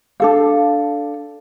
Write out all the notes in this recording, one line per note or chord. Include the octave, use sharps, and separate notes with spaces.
D4 A4 F5